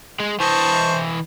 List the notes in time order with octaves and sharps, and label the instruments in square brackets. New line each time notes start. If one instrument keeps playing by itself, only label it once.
[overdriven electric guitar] G#3
[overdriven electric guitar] E3 D#5 [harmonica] C5 A5 C#6